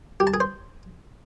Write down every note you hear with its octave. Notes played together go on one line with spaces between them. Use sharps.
G4
A5
G#4
C5